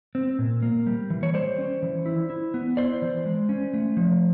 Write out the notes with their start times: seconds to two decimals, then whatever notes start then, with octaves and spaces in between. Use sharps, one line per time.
0.15 C4
0.39 A#2
0.62 A#3
0.86 G3
1.10 E3
1.23 C#5
1.34 G3 C5 D5
1.58 C#4
1.82 E3
2.06 E4
2.30 E4
2.54 B3
2.77 E4 C5 D5
3.02 E3
3.26 G#3
3.49 C#4
3.74 A3
3.97 F3